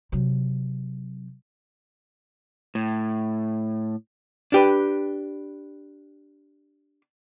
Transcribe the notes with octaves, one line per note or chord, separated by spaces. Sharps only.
C3 F#3
A2
D4 G4 B4